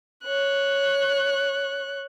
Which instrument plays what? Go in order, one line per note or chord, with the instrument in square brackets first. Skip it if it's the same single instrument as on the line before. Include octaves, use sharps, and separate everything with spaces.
[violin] C#5 F#6